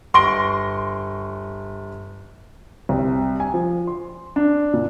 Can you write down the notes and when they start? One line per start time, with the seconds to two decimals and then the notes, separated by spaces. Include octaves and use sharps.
0.14 G1 C6 C#6 A#6 D7 G7
2.89 C2
3.40 G#5
3.54 F3
3.87 C6
4.36 D4
4.74 A#2